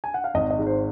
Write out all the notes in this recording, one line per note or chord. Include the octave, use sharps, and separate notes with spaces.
G#5
F#5
F5
G#1 D#5
D#5
G#2
C5